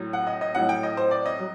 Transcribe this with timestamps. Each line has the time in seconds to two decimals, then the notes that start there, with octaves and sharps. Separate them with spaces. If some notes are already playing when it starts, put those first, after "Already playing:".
Already playing: A2 F#3
0.13 F#5
0.27 D#5
0.41 D#5
0.55 A2 F#3 F#5
0.69 G5
0.83 D#5
0.97 C5
1.11 D5
1.26 D#5
1.40 F#3